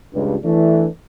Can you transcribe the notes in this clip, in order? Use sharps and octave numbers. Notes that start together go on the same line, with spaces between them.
C#2 G2
E3 A3 D4